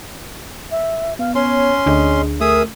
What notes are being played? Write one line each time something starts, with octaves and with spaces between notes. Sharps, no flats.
E5
B3 F5
C#4 C#5 C6
D2 D4 G#4 D#5
A3 G#4 A#4 E5 D#6